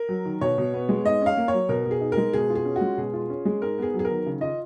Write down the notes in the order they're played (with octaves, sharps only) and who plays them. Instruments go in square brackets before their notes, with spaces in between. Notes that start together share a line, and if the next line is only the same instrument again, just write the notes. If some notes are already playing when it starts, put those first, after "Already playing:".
Already playing: [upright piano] A#4
F#3
D#3
B2 C#5
B2
B3
G#3
G#2 D#5
C#4 F5
A#3
C#5
F#3
B2 A#4
B2
G#4
D#4
A#4
G#3
B2 G#4
F4
G#4
C#4
F#4
G#3
B2 G#4
F4
C#4
G#3
G#2 A#4
B3 G#4
F#3
G#4
A#4
D#3
C#3
F4 D#5